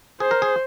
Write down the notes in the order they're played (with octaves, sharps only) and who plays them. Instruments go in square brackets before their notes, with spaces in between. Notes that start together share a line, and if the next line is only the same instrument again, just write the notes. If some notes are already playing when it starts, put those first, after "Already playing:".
[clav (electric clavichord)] G#4 [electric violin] C5
[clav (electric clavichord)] A#4
G#4